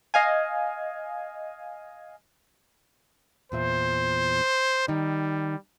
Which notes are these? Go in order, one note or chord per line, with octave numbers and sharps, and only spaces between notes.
D#5 F5 G#5
E2 A#2 C5 E5
D#3 G3 D#4